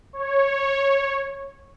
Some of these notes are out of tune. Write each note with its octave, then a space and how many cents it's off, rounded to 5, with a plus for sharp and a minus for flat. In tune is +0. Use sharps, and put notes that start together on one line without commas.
C#5 -10